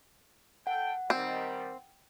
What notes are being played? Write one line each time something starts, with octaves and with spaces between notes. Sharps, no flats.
A4 F#5 G5
D#3 G3 C4